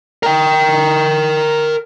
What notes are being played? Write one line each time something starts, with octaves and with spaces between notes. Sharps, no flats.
A#4 G5